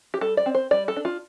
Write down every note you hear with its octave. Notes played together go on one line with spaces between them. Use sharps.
G4
G3 A4
D5
C4
C5
G3 D5
A4
D4
F4